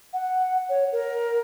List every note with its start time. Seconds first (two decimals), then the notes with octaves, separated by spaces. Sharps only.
0.13 F#5
0.69 C#5
0.92 A#4